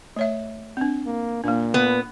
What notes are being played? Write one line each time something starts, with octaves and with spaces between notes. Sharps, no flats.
A3 C#5 E5
C4 D4
A#3
A#2 A#3 D4
B3